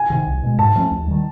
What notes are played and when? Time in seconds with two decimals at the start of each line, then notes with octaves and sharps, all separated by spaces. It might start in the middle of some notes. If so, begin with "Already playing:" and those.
Already playing: G#5
0.10 C3 D#3
0.27 C2
0.43 B2 G#3
0.58 G#2 A5
0.76 F3 A3 C#4
0.91 D#2
1.08 D#3 G3